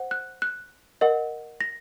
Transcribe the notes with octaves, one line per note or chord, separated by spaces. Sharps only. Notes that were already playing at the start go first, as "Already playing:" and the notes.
Already playing: C5 F#5
F#6
F#6
A#4 D#5 F#5
A#6